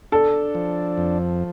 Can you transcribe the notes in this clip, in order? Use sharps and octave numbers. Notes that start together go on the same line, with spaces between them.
D4 A4
F3
F2